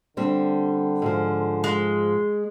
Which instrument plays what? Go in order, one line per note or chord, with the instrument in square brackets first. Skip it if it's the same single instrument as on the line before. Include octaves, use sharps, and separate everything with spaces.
[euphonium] D3 [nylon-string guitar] G3 C4 D4
[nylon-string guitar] G#2 F3
[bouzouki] G#3